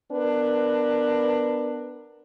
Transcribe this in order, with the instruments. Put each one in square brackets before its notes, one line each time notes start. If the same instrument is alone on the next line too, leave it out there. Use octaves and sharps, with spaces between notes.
[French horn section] B3 D4 A#4 B4